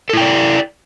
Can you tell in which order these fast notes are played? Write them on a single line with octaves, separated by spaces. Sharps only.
A4 E4 G5 D5